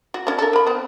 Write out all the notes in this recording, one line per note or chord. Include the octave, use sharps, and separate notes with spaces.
F#4
C#4 D4
A4 A#4
A#4 B5
B3 C4